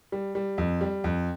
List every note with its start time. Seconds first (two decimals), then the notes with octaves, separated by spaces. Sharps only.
0.12 G3
0.35 G3
0.58 F2
0.81 G3
1.04 F2